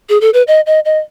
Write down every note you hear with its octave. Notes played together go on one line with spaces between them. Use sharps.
G#4
A4
B4
D#5
D#5
D#5